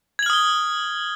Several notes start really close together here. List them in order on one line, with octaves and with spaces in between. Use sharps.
G#6 F#7 F6 D#6 G7